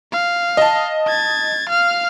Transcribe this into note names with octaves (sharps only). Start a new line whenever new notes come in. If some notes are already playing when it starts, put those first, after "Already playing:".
F5
D#5 A5
G#6 A6
F5 F6